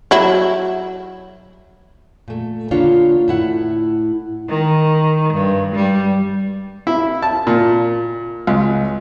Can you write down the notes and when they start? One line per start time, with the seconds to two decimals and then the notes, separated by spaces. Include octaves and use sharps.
0.11 F#3 E4
2.28 A#2 A3
2.71 D3 A#3 B3 D4 F4 C#5
3.28 A2 E4 F#5
4.48 D#3
5.34 G2
5.75 G3
6.87 E4
7.22 A5
7.47 A#2
8.47 C#2